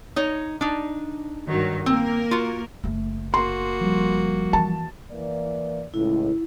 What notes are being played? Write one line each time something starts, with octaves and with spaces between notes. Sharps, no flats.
D#4 C#5
D4 D#4
G2 D#3 F#3
A#3 C4 A#4
F4 F#4
F#1 A3
A#3 F#4 C6
F3 G3
E3 A5
E3 A#3 D5
C#2 A2 E4